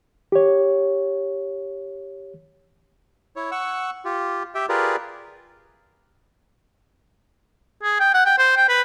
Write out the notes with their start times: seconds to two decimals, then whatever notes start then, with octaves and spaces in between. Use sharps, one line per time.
0.32 G4 C#5
3.36 E4 C#5
3.51 F#5 C#6 E6
4.05 F4 G4
4.55 G4 E5 G5
4.69 F4 G4 G#4 A#4 B4 D5
7.83 G#4
8.00 G5
8.14 F#5
8.26 G5
8.38 C5
8.57 G5
8.69 B4